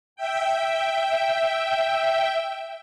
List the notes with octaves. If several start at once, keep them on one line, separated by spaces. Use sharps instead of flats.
E5 G5